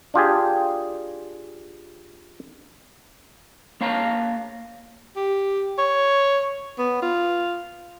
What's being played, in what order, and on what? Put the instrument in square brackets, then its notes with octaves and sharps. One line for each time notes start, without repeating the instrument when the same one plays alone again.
[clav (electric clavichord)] D4 F4 G4 G#4
[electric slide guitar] A#3 C#5 F5 A5 A#5
[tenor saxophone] G4
C#5
B3
F4